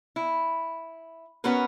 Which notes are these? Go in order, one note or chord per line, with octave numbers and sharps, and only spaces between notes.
E4
B3 C#4 F#4 A#4 B4